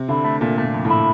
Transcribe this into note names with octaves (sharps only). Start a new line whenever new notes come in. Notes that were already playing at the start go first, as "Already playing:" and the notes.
Already playing: C3
D3 E4
A3
A#2 A3
A3
A#2
F2
A2
E4